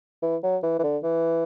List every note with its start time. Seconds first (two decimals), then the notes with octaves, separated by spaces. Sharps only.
0.22 E3
0.43 F#3
0.63 E3
0.79 E3
0.83 D3
1.03 E3